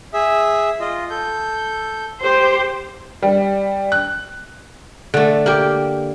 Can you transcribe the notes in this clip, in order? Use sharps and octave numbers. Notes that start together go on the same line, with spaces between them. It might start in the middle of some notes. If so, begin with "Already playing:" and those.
G#4 E5
F4 D#5
A4 G6
G4 C5
G3
F#6
D3 A3
A#3 G4